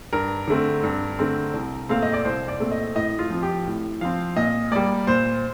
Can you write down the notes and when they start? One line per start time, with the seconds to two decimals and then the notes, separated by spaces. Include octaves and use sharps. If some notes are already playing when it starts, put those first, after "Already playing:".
0.13 G2 A#4
0.48 D3 A3 C4
0.83 G2
1.19 D3 A3 C4
1.54 C2
1.89 A#2 A3 C4 F5
2.02 D#5
2.13 D5
2.25 C2 C5
2.48 D5
2.60 A#2 A3 C4
2.72 D#5
2.95 A2 D#5
3.19 F4
3.30 F3 C4
3.42 G4
3.66 A2
4.01 F3 C4 F5
4.36 A#2 D#5
4.72 G3 A#3 D5
5.07 A#2 C5